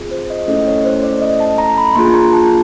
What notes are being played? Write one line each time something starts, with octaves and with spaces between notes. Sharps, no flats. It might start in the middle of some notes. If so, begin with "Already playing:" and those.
Already playing: C4 F4 G#4
C5
D#5
A3 C#4 E4 A4 D#5
C#5
C5
D5
D#5
A5
A#5
B5
A#3 D4 F4 G#4 C6
A#5
A5